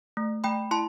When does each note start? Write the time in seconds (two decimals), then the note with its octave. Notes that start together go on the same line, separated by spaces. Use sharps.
0.17 A3
0.44 A3 G5 B5
0.71 E4 A5 C6